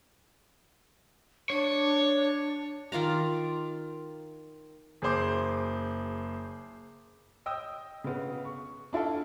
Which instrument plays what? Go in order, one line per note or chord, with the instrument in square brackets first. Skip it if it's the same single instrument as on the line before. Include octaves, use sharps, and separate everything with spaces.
[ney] D4 [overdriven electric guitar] C#5
[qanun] D#3 F4 D5 A#5
[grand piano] F#1 G#4 C5 D6
[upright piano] D#5 G5 D#6 E6
C#3 B3
C#6
D4 E4 F4 A4